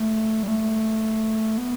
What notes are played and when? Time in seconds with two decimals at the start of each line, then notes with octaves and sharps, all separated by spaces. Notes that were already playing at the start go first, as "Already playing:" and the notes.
Already playing: A3
0.43 G3
0.48 A3
1.57 B3